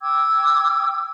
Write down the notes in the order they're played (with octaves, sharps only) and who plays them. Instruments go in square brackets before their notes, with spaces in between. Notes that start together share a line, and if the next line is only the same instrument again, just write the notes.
[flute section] G5 D6 E6 G#6